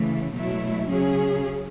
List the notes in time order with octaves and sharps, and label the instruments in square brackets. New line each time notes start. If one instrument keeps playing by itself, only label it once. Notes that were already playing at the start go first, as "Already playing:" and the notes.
Already playing: [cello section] C#3 E3 A3
B2 F#3 A3 E4
C#3 F#3 C#4 G#4